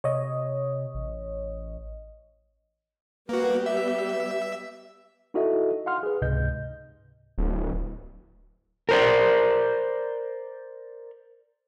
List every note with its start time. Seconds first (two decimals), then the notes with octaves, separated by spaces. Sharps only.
0.04 C3 C#5 D#5
0.94 A1
3.29 G3 A#3 B3 F#4 G4 B4
3.66 B4 E5
5.34 D#4 E4 F#4 A4 D#5 E5
5.86 F5 F#5 C6 F6
6.03 G#4 B4
6.22 C#2 G#2 C3 D#5 G6
7.38 D1
8.89 A#4 C5 D5